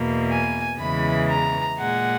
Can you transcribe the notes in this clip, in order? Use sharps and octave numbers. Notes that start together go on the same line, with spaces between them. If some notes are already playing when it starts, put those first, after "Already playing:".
Already playing: E2 B2 A#3
G#5
E2 C#3 E3 G#3 B5
A#5
A#2 G#3 F#5